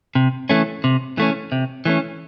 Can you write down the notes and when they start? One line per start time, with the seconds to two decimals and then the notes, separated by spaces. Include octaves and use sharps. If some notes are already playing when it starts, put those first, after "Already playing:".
0.15 C3
0.49 E3 A3 C#4
0.84 C3
1.18 E3 A3 C#4
1.52 C3
1.85 E3 A3 C#4